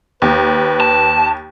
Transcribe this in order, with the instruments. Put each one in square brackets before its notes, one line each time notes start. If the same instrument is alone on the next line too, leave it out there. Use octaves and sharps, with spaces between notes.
[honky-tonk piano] D#2 [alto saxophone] B4
[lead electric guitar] A5